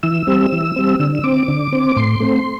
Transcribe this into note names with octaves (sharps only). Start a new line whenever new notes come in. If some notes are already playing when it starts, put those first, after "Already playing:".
E3 E6
G3 C4
E3
G3 C4
D3 E6
E6
C4 D6
D3
C4
A2 C6
A3 C4